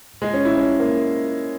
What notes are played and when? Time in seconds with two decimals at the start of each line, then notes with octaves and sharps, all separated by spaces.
0.22 G#3
0.34 C#4
0.45 E4
0.56 C#4
0.80 A#3